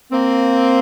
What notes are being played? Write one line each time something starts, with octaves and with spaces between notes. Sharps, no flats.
A#3 C4